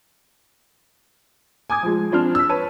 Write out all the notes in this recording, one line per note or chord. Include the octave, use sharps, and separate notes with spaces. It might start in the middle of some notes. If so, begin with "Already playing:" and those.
G#5 D6 D#6 G#6
F3 G#3
F3 C4 D4 C5 F6
E6 B6
B4 C#5 A5 D#7